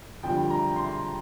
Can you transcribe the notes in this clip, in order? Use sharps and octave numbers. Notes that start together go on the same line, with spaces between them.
F2 D3 G3 G5
A#5
C6